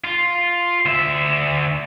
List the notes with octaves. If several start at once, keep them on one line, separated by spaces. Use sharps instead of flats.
F4
D2 E5